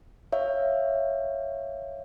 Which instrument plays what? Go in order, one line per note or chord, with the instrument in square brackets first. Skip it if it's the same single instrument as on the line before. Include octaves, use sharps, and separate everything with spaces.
[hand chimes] C#5 E5 F5